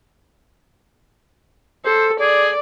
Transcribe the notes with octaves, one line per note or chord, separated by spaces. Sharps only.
A4 C5
G#4 D5